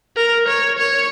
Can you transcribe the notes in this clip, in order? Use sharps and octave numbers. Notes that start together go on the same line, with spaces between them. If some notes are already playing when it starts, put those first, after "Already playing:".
A#4
C#5
C#5